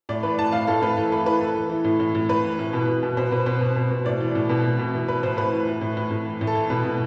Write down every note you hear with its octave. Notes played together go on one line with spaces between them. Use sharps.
A2 D5
E3 B4
E3 A5
A2 F5
A2 A4
A2 B4
E3 A4
E3 B4
E3 B4
E3 A4
E3
E3
A2
A2
A2
A2 B4
E3
A2
B2
B2
B2
B2 C5
B2 B4
B2 C5
B2
B2
B2
A2 D5
E3
A2
B2
B2
B2
E3
E3 B4
A2 C5
A2 B4
E3
A2
A2
A2
A2
E3
A2
A4
E3
B2 B4
B2